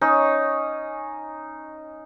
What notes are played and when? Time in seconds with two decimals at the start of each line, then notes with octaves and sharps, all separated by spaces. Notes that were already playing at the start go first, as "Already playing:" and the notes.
0.01 C#4 D#4